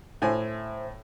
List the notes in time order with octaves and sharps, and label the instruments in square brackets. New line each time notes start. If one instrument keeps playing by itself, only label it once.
[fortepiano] A2 G#5 [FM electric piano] C5 E5